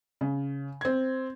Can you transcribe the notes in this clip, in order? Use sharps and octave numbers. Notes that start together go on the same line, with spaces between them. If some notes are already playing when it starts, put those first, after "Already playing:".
C#3
C4 G#6